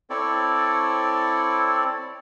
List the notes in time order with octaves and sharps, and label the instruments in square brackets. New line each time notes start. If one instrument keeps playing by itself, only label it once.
[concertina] C4 E4 A4 C#5 D5